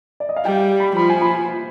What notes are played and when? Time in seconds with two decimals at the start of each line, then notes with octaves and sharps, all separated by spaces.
0.20 D5
0.29 D#5
0.36 F5
0.45 G3 G5
0.80 B5
0.97 F3 B5
1.10 G#5
1.22 B5